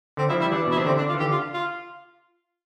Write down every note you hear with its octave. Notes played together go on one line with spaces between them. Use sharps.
D3 C4
F3 E4
G3 E4
E3 D4
B2 E4
C3 D4
D3 C4
D4
F4
E3
D3 G4
F4
F4